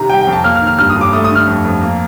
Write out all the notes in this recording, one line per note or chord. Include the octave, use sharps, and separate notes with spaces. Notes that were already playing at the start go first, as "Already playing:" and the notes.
Already playing: C3 D#3 A#5
G3 G5
G5
F2
A5
A#3 F6
F6
D#3
F6
G2 F6
D#6
G2
D6
A3 D#6
D#6
D3
F6
F2
F2
A#3